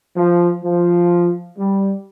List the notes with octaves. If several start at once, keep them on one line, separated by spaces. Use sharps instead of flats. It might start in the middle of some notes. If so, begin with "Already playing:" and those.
F3
F3
G3